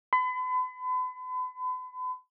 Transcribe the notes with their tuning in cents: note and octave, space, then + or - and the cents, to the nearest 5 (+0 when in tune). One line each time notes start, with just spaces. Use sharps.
B5 +40